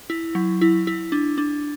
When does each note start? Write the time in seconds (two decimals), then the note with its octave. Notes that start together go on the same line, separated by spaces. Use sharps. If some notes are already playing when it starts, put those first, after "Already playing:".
0.10 E4
0.35 F#3
0.61 E4
0.87 E4
1.12 D4
1.38 D4